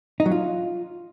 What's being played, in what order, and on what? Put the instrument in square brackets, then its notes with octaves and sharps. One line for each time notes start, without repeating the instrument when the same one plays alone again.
[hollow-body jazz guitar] D#4
F#3
F4